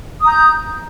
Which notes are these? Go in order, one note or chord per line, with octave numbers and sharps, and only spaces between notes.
A#5 D#6 G6